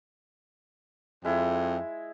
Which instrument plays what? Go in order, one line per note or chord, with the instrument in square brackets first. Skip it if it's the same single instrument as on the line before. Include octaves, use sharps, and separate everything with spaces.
[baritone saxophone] F2 [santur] G#3 E4